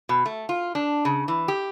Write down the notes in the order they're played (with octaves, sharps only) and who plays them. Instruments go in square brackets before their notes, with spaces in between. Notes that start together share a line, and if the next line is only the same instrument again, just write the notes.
[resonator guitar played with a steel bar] B2
A3
F4
D4
C#3
E3
G4